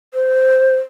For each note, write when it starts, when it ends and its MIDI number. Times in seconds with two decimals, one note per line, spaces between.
0.14 0.76 72